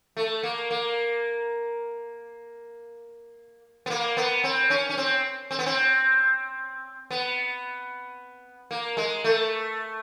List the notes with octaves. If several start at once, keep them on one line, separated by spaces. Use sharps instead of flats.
A3
A#3
A#3
B3
A#3
B3
C4
C#4
C#4
C4
C4
B3
C4
B3
A#3
G#3
A3